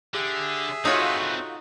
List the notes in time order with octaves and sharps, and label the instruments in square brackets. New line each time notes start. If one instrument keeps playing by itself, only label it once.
[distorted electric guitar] D3 [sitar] G4 [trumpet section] G#4 E5
[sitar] A3 F4 F#4 [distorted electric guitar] C4 B4 [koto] D#4 C#5